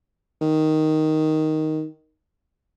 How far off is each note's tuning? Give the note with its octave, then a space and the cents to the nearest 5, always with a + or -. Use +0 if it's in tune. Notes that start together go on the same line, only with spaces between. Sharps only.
D#3 +5